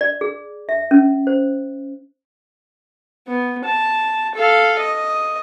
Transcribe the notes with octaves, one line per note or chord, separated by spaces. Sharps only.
D5
G#4
E5
C#4
C5
B3
A5
A4 F5
D#5